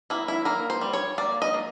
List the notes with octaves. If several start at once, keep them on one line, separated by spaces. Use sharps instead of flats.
A#3 E4
E4
A#3 A#4
C5
G3
C#5
A#3 D5
D#5
A#3